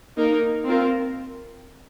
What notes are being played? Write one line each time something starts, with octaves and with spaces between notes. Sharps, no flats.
A#3 D#4 A#4
C4 F4 A#4